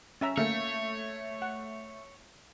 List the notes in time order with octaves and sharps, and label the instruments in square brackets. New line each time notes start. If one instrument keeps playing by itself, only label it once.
[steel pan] C#4 E5 A#5
[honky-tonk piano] A3 [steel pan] A#3 [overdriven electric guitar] C#5
[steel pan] F#5